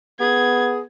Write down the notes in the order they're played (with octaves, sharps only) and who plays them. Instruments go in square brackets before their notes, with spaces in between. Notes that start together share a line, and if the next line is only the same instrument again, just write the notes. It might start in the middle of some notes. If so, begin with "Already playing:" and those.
[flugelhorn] B3 [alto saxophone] G#4 [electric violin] G#6